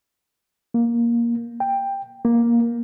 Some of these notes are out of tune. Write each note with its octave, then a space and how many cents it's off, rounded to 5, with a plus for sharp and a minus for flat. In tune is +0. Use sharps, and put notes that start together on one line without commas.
A#3 +10
G5 +10
A#3 +10